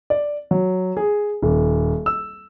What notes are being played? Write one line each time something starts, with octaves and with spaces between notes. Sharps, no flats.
D5
F#3
G#4
D#1
E6